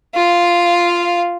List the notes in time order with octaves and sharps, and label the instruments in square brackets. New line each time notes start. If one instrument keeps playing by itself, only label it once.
[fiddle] F4 F5